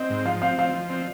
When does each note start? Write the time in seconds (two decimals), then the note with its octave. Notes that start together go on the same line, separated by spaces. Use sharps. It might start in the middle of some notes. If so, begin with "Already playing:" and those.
Already playing: C4 D#5
0.10 G#2
0.25 F3 F5
0.42 C4 F5
0.58 F3 F5
0.75 F3
0.90 C4